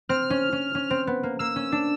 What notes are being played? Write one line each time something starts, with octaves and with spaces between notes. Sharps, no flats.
C4 F6
C#4
C#4
C#4
C4
B3
A#3
A#3 E6
C#4
D4